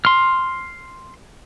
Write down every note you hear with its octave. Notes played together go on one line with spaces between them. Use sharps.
C6 F6